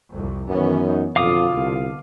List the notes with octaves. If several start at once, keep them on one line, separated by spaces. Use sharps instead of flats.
C2 F2
F#2 D#3 E3 B3 C#4
D#4
F2 B2 D3 F4 F5 D6 D#6
C2